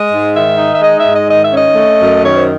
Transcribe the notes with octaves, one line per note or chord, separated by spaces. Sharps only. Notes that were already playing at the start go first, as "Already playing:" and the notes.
Already playing: G#3 D#5
G#2
D#3 E5
D#4
E5
G#3 D#5
E5
G#2
D#5
D#3 D#5
E5
C#4 D#5
A3
F#2
D#3 C#5
C5